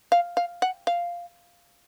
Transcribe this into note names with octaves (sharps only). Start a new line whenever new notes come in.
F5
F5
F#5
F5